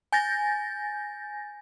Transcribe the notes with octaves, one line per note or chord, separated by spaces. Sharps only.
G#5 G6 A6 A#6